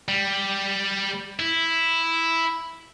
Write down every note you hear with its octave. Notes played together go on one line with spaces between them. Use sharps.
G3
E4